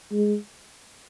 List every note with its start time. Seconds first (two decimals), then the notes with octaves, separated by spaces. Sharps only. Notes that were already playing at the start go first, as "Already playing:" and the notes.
0.12 G#3